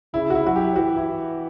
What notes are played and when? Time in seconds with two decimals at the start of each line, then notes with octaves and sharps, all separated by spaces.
0.14 C#3 E4
0.30 F#4
0.35 E4
0.45 F#3 F#4
0.56 G4
0.75 E3 F#4
0.97 E4